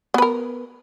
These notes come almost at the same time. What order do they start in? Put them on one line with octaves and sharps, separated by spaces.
B3 B4 A#4